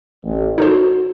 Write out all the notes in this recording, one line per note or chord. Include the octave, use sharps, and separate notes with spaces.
A1
D#4 F#4 A4 C5